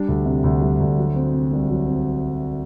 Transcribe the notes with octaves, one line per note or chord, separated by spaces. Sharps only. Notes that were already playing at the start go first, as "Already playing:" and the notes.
Already playing: G3 D4
D2
C3
D2
G3
D2
F#3
C4
C3
C2
F#3
C4